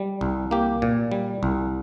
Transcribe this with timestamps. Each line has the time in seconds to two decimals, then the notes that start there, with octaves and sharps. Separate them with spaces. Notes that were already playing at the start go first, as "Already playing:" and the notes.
Already playing: G3
0.21 C2
0.51 A#3 G4
0.82 A#2
1.11 G3
1.43 C2